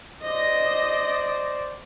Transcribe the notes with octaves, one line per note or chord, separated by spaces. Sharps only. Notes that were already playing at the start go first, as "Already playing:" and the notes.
C5 D5 D#5 A#6